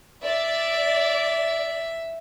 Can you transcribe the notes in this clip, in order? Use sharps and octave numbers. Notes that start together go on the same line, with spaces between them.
D5 E5